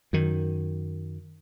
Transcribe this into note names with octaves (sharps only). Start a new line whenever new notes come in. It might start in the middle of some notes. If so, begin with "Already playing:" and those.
F#2 D#3